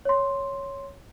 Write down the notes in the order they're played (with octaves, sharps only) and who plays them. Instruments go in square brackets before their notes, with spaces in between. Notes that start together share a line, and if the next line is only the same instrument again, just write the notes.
[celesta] C#5 C6